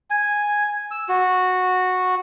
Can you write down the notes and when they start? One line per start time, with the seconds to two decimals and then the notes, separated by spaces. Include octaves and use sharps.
0.10 G#5
0.91 E6
1.09 F#4